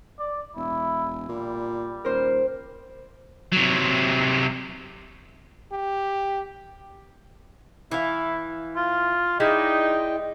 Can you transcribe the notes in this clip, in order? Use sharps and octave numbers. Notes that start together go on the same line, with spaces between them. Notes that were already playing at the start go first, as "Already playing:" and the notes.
D5
E1 E4
A#2 G3
D#1 A#4 C5
C3 F#3
G4
E3 E4 F5
F4
G#3 D#4 E4 D5 D#5 G5